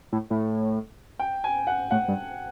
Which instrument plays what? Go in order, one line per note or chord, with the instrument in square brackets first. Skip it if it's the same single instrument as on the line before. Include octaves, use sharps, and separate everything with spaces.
[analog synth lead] A2
A2
[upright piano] G5
G#5
F#5
[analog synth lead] A2 [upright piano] F#5
[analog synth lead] G2